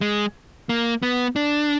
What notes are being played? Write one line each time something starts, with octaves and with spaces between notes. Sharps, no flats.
G#3
A#3
B3
D4